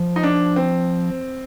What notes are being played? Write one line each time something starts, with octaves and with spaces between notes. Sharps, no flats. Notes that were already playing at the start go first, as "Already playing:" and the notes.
Already playing: F3
D#4
D4
C4